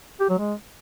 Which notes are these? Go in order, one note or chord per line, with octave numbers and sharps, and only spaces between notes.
G4
F#3
G#3